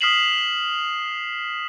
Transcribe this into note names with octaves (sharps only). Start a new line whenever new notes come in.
D#6 F6 B6 C7 E7 F#7